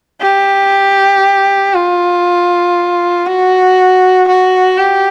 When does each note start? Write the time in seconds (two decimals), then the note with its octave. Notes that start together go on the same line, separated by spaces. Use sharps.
0.21 G4
1.74 F4
3.25 F#4
4.28 F#4
4.78 G4